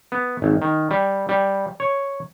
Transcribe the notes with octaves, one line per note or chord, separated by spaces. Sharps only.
B3
G#1
D#3
G3
G3
C#5